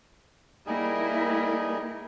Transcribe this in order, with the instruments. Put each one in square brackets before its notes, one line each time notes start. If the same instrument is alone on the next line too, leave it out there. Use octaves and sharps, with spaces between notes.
[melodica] G3 D#4 G#4 [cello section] A#3 E4 A#4